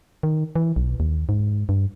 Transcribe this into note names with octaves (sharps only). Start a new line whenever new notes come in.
D#3
E3
B1
D#2
G#2
G2